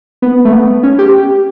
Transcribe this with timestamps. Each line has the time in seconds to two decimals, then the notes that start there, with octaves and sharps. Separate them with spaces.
0.22 B3
0.45 A3
0.53 B3
0.83 C#4
0.99 G4